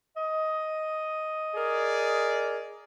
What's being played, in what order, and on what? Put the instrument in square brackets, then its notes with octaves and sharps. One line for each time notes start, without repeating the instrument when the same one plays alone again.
[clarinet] D#5
[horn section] G#4 A#4 D5